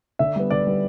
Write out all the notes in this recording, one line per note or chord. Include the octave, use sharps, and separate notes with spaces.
D3 E5
G3 B3
D3 D5
G3 B3